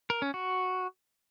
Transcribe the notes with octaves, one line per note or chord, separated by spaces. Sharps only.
A#4
C#4
F#4